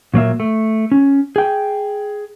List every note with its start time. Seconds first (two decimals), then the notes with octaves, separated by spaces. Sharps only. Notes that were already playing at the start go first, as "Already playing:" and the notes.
0.14 A#2 F#3 A#3 E5
0.40 A3
0.92 C#4
1.36 G#4 G5